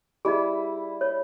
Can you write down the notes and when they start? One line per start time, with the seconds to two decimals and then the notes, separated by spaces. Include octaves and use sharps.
0.25 G3 E4 G#4 D#5
1.01 C#5